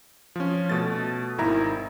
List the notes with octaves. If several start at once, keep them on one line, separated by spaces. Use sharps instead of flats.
F3 C#4
B2 A3 A6
G#1 D#3 E4 A#5